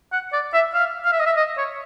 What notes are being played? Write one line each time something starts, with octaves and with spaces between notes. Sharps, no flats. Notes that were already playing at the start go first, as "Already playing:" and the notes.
F#5
D5
E5
F5
F5
E5
D#5
E5
D#5
C#5